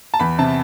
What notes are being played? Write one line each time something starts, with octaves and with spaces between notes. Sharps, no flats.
A5
E2 B5
C3 A5